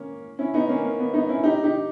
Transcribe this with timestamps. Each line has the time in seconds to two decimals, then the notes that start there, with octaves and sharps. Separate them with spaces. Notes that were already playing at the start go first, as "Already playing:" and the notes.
Already playing: A#3 C#4
0.39 C#4 E4
0.54 B3 D#4
0.69 A#3 C#4
0.85 A#3
0.99 B3
1.14 B3 D#4
1.29 C#4 E4
1.44 D#4 G4
1.63 D#4 G4